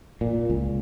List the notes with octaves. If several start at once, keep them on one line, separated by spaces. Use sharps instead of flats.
A#2
C#2